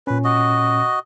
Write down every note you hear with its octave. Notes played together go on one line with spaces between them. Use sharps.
A#2 C#4 B4
F#4 D#5